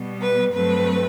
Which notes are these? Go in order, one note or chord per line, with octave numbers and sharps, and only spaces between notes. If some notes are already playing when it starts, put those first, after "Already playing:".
Already playing: B2 G3 B3
B4
G2 F#3 A3 C4 B4